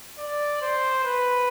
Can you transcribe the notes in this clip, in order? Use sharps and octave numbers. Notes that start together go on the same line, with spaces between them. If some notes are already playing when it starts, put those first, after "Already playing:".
D5
C5
B4